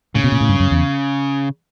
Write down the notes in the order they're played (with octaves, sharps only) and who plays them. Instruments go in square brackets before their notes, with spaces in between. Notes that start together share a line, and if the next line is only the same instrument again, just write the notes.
[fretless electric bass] A2 [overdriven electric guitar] C#3
[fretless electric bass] B2
A#2
A2
G2
F#2
E2